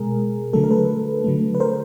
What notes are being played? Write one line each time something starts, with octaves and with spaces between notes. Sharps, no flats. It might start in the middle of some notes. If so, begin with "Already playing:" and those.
Already playing: B2 G#3 G#4 A#4
D3 F#3 A3 A4
A#4
A4 B4
D3 F#3 A3
B4
A#4 C5